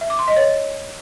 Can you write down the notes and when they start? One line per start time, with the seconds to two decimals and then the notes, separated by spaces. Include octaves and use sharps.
0.01 E5
0.10 D6
0.19 C6
0.28 D#5
0.37 C#5